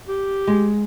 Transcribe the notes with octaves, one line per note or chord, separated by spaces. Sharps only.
G4
G#3